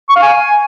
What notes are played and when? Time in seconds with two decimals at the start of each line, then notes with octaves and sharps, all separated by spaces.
0.09 C#6
0.16 F5
0.22 G#5